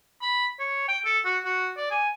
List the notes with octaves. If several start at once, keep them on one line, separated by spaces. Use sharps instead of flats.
B5
C#5
G5
A4
F#4
F#4
D5
G#5